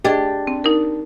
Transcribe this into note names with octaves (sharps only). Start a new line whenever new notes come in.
D4 G4 G#4 D#5
C4
D#4 A#4